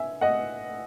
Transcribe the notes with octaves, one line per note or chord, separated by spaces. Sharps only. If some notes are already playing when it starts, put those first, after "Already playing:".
Already playing: E5 G#5
D#5 F#5